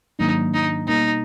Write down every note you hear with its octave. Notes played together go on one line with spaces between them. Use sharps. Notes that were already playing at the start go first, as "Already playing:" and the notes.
G#2 D#3 F#3 A#3 D4 D#4
D#4
B2 G3 A#3 D#4